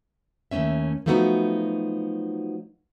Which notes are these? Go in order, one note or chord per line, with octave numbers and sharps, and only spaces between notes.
D#2 C3 A3 C#4 E5
F3 F#3 A3 B3 D#4 F#4